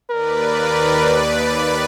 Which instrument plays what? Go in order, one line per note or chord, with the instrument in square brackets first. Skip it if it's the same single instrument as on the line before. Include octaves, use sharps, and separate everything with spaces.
[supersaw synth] D#2 B4 D5 [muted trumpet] A#4